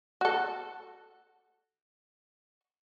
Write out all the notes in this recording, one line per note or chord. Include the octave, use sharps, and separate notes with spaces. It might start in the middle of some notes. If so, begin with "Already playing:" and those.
F#4 A4